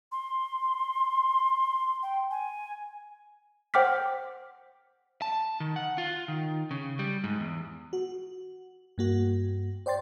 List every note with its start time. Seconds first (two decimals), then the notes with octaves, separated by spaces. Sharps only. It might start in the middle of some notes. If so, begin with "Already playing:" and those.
0.12 C6
2.03 G5
2.31 G#5
3.74 C5 F#5 G5 D6 F6 B6
5.22 A5
5.60 D#3
5.76 F#5
5.98 F4
6.28 D#3
6.71 C#3
6.99 G3
7.24 G#2
7.40 E2
7.93 F#4
8.98 G2 A#3 F#4
9.86 C5 D5 G5 C6 A6